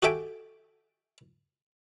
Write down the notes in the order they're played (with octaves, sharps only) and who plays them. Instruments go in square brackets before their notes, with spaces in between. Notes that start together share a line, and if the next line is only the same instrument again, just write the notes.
[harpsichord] F#4 G4 A4 E5 G5 G#5